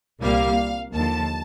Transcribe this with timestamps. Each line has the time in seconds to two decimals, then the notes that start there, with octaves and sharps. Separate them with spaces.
0.23 C2 A#2 G3 A#3 F5
0.94 D#2 D3 F3 A5